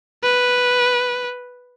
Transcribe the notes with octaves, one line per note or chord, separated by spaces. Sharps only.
B4